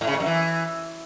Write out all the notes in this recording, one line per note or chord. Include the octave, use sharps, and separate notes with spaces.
A2
C#3
A2
F#2
E3